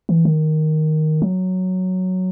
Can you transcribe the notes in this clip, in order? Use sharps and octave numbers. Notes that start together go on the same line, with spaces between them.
E3
D#3
F#3